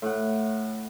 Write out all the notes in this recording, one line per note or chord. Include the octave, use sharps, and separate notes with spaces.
A2 F#5